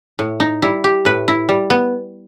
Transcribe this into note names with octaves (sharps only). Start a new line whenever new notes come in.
A2
D#4
G3 E4
G4
A2 B4
E4
G3
B3